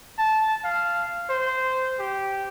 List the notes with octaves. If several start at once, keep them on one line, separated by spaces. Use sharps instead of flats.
A5
F5
C5
G4